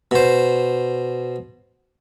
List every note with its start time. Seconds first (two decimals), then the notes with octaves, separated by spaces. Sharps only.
0.11 B2 C5